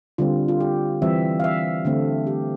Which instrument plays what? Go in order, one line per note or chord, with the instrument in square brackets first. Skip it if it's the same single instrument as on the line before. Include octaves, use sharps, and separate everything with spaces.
[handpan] D3 G3 C4 F4
F4
G4
E3 G3 C4 E5
F5
E5
D3 A3 C4
G4